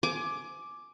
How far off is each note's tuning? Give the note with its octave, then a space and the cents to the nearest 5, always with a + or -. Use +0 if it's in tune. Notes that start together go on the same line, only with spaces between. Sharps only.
G#5 +25 D6 +0